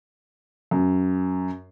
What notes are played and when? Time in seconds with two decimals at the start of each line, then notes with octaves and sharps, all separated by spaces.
0.71 F#2